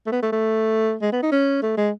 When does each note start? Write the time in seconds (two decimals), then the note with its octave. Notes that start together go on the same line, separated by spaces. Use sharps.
0.06 A3
0.12 B3
0.22 A3
0.32 A3
1.02 G#3
1.12 B3
1.23 D#4
1.32 C#4
1.62 A3
1.77 G#3